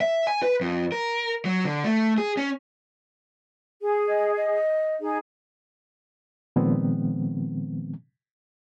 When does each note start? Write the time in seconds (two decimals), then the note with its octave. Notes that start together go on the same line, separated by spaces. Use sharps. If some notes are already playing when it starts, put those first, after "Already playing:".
0.01 E5
0.27 G#5
0.42 B4
0.61 F2
0.92 A#4
1.45 F#3
1.65 D3
1.84 A3
2.18 G#4
2.37 C#4
3.82 G#4
4.08 D#5
4.37 D#5
5.00 D#4 G#4
6.56 A#2 D#3 F3 G#3 B3 C4